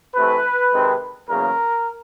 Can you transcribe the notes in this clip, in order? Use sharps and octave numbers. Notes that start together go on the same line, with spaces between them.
C3 E3 A3 B4
C3 D#3 G#3 C4
E2 C#3 F#3 A#3 A#4